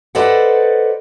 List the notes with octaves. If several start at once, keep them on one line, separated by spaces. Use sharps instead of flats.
A4 B4 C5 D5 D#5 F#5